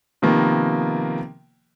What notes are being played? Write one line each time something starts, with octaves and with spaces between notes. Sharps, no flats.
C3 D#3 F3 A#3 B3